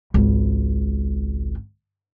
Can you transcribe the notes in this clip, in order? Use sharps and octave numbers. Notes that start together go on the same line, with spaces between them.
G#1 C#2